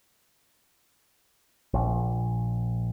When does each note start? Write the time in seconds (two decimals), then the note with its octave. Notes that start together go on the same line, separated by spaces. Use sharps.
1.74 A#1